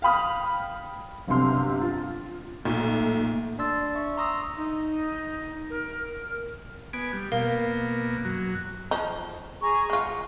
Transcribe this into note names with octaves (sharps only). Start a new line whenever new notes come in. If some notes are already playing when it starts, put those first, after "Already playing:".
F5 G5 B5 D#6 F6
G1 C2 F#2 C3 C6 F6
F4
B1 A#2 A3
D4 D5 C6 E6 A6
D5
E5 C#6
A#5 C6 C#6 D#6 E6 A#6
D#4
A#4
B3 G#5 D7
G3
B2 A#3 A#4 F5
F#2 F#3
F3 D#4
G#4 A#5 C#6
G#3 F4 F#5